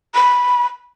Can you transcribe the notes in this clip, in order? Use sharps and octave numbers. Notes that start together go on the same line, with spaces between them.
B5